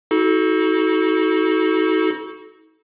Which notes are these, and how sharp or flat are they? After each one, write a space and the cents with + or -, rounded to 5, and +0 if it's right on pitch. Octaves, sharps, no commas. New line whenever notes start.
D#4 +45 F#4 +10 A4 -20